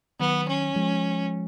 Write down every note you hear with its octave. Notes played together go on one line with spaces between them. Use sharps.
D#3 F#3 B3
C#4
F3 G#3